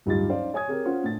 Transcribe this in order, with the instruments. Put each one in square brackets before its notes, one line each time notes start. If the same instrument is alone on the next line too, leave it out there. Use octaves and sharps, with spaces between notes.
[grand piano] D1 G2 D#4 F4 G4 A6
C#4 D#4 C5 D5 F5
C#5 G#5 D#6 G#6
C4 G4 G#4 A#4 C#5
C#4 F4 C5 F#5
A2 D4 A6